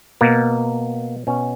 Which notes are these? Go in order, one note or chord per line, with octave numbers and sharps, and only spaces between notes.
B2 A#3
B2 C#4